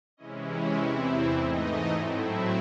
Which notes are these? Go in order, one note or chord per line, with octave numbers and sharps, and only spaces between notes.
C3 E3 G#3 C#4 E4 D#5
C#5
E2 C3 E3 C4 E4 D#5
E5
G#2 E3 A3 D#4 D#5
A2 F#3 A3 C4 E4
E5